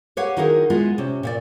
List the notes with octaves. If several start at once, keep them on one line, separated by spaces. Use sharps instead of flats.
G4 B4 C#5 F5 F#5
D#3 D#4 E4 F#4 G#4 A#4
G#3 B3 E4 F4
C3 C#4
A#2 C#5 D5